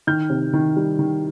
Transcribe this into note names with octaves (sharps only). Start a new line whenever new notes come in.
D#3 F6 G6
C3
D#3
G3
D#3